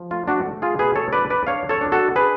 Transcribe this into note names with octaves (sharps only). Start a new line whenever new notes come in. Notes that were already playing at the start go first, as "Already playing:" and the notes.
Already playing: F3
A3 F4
D4 F#4
A3
F4 G#4
B2 G#4 B4
A4 C#5
D4 B4 D5
B4 D5
D4 C#5 F5
A4 C#5
D4
F#4 A4
D4 G#4 B4